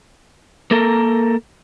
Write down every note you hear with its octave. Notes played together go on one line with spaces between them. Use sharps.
A#3 A4 A#4